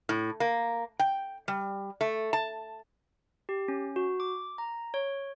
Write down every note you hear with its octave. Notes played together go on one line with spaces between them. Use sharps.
A2
A#3
G5
G3
A3
A5
G4
C#4
F#4
D6
A#5
C#5